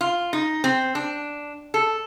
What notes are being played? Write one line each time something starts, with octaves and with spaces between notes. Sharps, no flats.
F4
D#4
C4
D4
A4